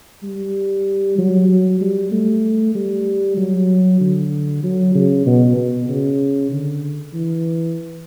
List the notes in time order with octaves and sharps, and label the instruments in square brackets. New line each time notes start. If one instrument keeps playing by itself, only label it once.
[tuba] G3
F#3
F#3
G3
A3
G3
F#3
D3
F#3
C#3
B2
B2
C#3
D3
E3